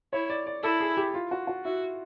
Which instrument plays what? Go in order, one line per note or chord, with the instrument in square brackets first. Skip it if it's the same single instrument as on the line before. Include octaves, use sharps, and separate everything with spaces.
[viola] E4 [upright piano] C#5
[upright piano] D5
D5
[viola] E4 [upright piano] A4
[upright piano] G#4
G4
F4
F#4
F#4
[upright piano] E4 [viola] F#4